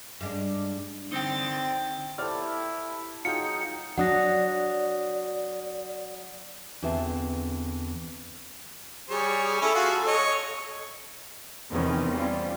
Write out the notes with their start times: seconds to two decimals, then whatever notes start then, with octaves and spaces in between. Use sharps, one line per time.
0.21 G2 G#3 D4
1.12 D3 C4 D#4 G5 A6
2.18 E4 G4 A4 C5 D5 F6
3.25 F#3 D#4 F4 G#4 G5 C#7
3.98 F#3 D4 D5 F#5 D#6 A#6
6.82 E2 D3 C4 F4 E5 A5
9.09 G3 G#4 C#5
9.62 C#4 E4 A4
9.75 F4 F#4 G#4
10.07 C#5 D#5
11.71 E2 C3 D#3 B3 C#4
12.13 G3 C4 C#4 F4